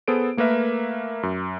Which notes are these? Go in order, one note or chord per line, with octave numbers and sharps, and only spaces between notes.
B3 G#4 A4 C5 D7
A3 A#3 A#4 B4 E5
F#2